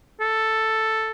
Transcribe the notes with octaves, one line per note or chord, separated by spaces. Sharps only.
A4